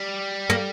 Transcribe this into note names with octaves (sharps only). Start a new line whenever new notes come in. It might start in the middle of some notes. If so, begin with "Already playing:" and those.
Already playing: G3
A#3